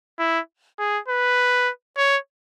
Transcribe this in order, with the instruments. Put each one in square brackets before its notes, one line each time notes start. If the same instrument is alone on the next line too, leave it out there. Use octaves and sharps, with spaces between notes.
[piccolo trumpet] E4
G#4
B4
C#5